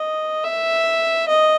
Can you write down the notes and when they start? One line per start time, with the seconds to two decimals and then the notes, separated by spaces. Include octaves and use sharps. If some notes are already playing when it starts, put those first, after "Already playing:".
Already playing: D#5
0.44 E5
1.28 D#5